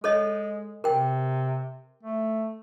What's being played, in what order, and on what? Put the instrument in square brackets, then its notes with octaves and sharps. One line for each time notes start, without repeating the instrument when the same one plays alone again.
[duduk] G#3 [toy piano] A4 C#5 D#5
[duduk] C3 [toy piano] A#4 G5
[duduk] A3